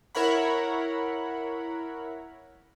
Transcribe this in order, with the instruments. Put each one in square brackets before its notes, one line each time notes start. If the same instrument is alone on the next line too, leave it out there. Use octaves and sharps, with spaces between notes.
[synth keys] E4 A#4 C#5 F#5 B5